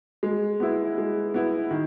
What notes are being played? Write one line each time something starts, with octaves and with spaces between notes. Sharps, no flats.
G#3
B3 E4
G#3
B3 E4
D#3